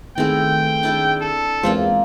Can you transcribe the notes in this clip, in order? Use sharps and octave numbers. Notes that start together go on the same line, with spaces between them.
D#3 A3 B3 C4 E4 G#4 G5
D4 E4 A5
A4
E2 G#3 A#3 C4 F4 C5